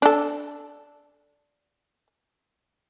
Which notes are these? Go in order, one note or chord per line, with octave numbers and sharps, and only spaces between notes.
D4 A4